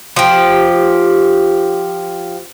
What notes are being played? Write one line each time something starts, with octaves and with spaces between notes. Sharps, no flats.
F3 G4